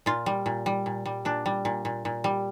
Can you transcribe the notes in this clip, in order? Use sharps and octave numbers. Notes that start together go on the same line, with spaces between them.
A#2 F4
G3
A#2
G3
A#2
G3
A#2 D4
G3
A#2
A#2
A#2
G3